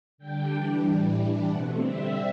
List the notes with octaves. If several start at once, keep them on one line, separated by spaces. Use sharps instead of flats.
D3 G3 D4 G5
E3 G3 D4
A2 E3 G3
E3 G3 D4
B2 A3 C4 F#5
D3 G3 C4 E5